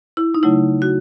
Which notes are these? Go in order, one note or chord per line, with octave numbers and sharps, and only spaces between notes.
E4
D#4
C#3 F#3 A3 E4
F#4